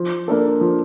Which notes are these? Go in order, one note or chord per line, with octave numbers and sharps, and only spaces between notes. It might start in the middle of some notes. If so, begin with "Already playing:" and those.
Already playing: F3
A#3 D4 A4
F3